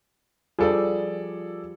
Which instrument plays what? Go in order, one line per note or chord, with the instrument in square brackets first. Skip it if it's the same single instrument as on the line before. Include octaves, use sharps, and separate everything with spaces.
[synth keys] F3 G3 [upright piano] G#4 A4 D5